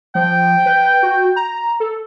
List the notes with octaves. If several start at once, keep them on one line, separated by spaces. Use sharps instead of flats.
F3 G5
B4
F#4
A#5
A4